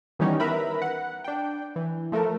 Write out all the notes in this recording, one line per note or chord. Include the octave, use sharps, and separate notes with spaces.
D#3 E3 G3 B3 C#4 D#4
A#4 B4 E5 A#5 B5
F#5
D4 G5
E3
F3 A3 A4 A#4